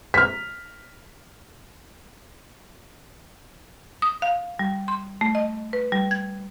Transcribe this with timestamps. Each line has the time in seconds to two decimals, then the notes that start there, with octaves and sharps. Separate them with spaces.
0.14 F6 B6
4.02 D#6
4.22 F5
4.59 G3
4.88 C6
5.21 A3
5.35 D#5
5.73 B4
5.92 G3
6.11 G#6